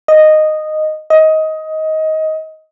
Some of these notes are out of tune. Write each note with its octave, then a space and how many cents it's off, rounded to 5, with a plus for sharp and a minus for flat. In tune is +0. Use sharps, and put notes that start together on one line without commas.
D#5 -10
D#5 +15